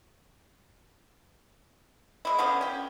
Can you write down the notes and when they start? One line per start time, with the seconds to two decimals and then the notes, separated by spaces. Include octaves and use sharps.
2.25 G#3 E4
2.38 D3 F3 B3 C#4
2.61 C#4 G5